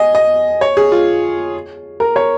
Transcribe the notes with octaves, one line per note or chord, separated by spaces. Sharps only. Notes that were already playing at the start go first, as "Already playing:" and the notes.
Already playing: D#5 G#5
D#5
C#5
G#4
F4
A#4
C#5